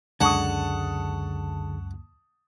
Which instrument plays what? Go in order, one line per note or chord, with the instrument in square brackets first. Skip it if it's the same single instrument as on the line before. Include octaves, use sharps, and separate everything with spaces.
[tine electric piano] C#2 F#2 [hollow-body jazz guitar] D3 G#3 [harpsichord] F#5 [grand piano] A5 C#6 D#6